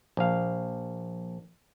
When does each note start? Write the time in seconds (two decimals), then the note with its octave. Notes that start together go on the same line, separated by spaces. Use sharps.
0.17 A#1 F5